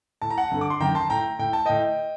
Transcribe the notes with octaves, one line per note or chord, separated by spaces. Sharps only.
A2 A5
A#5
F#5 A5
G2 D3
D6
C6
F#2 D#3 G5 A#5
A5 C6
A2 G5 A#5
A2 G5
A5
A2 D#5 G5